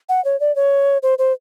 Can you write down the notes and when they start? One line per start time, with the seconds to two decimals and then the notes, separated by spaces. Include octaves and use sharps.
0.09 F#5
0.25 C#5
0.40 D5
0.56 C#5
1.03 C5
1.19 C5